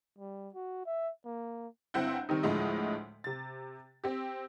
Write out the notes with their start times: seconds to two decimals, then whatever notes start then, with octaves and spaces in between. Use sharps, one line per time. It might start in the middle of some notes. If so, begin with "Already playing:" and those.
0.19 G3
0.54 F#4
0.86 E5
1.25 A#3
1.94 G1 C4 E4 F#5 G6
2.29 D#3 G3 C4 D#4
2.43 D2 A2 F3 G#3 D#5
3.24 C3 A6
4.04 C4 G4